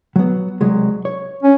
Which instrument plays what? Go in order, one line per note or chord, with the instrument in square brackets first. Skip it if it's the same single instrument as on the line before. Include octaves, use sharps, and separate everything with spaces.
[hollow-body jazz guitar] F#3 B3
C2 F#3 G#3
C#5
[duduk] C#4